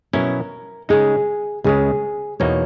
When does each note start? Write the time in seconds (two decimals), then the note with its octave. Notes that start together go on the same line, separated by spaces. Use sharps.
0.13 B2 F#3 C#4 E4 A#4
0.89 C#3 G#3 D#4 G#4
1.64 C#2 C#3 G#3 G#4
2.40 E2 B2 A#3 D#4 C#5